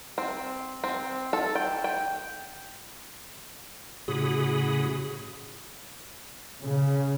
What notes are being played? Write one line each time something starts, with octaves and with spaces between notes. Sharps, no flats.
C4
C4
A4
G5
G5
A2 C#3 F#4 G#4 B5 D#6
C#3